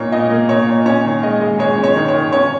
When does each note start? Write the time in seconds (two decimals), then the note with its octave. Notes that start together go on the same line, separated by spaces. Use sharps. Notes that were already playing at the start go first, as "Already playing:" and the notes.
Already playing: A#2 A#3 D#4 C#5
0.12 A#2 D#5
0.31 A#3
0.49 A#2 C#5
0.67 A#2
0.86 C#4 C#5
1.05 D#3
1.23 G#3 D#5
1.41 G#3
1.59 G#3 C#5
1.78 C#4
1.84 C#5
1.96 D#3
2.08 C#5
2.14 D#3
2.33 C#4 C#5